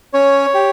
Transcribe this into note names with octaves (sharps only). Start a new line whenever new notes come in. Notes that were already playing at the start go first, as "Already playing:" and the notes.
C#4 C#5
G4